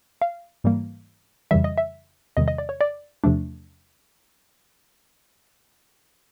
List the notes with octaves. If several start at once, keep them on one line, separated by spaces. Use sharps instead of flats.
F5
G#2 E3 G3 A#3
F2 C#3 E3 G3 E5
D#5
E5
E2 C3 D#3 G3 D#5
D#5
D5
C#5
D5
E2 C3 F3 A3 D4